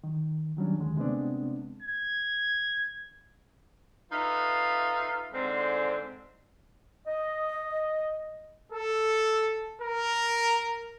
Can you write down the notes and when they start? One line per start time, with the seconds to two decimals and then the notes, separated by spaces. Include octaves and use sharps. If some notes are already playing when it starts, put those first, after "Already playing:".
0.04 D#3
0.57 D#3 F#3 G3 C#4 D4
0.80 D#2 D3 D#3 G#3
0.97 C3 G#3 A3 B3 C4 D4
1.82 G#6
4.12 D#4 F4 A4 B4 E5 F5
5.32 G#2 D3 C4
7.07 D#5
8.72 A4
9.82 A#4